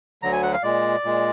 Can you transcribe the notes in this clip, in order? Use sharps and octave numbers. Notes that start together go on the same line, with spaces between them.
D2 D3 F#3 A#5
G#5
F#5
F5
A#2 G#3 D5
A#2 G#3